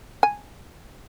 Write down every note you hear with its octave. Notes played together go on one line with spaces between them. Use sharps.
G#5